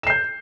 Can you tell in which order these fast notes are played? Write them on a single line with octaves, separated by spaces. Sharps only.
E7 C7 G6